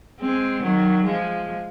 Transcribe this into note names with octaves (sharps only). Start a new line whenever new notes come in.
G#3 C4
D#3 F#3
F3 G#3